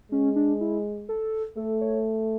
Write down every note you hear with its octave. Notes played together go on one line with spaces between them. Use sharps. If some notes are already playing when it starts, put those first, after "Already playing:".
G#3 C#4
D4
E4
A4
A3 A4
C#5